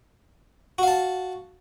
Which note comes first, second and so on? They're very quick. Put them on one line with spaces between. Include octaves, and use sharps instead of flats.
F#4 F5 A5